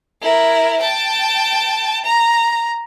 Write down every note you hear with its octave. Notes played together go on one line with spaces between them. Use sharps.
E4 A#4
G5 A5
A#5